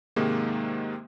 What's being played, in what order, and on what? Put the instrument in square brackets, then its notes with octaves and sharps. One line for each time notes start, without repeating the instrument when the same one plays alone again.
[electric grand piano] G#2 C3 D#3 G#3 A#3